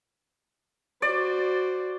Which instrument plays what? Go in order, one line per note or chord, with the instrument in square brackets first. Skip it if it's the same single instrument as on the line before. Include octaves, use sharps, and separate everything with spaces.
[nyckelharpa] F#4 C5 [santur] D5